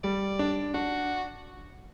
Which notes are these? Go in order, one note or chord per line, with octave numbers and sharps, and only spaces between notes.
G3 D5
D4
D4 F#4